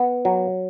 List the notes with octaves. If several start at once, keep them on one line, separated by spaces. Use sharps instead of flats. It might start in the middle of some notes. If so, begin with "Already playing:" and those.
Already playing: B3
F#3